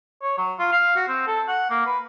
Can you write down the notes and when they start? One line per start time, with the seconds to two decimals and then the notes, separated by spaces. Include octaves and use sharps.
0.22 C#5
0.38 F#3
0.59 F4
0.72 F5
0.96 F#4
1.08 C4
1.27 A4
1.48 F#5
1.70 A#3
1.86 B4